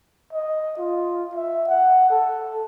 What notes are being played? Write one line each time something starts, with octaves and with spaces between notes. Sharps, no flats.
D#5
F4
E5
F#5
A4